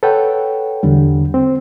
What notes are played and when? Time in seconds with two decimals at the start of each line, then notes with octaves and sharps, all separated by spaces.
0.03 A4 B4 C#5 F#5 G5
0.83 E2 D3 G3
1.34 C4